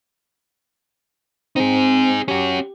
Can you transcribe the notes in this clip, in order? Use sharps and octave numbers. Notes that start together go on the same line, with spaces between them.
C4 D#4 G#4
C#4 F#4 G4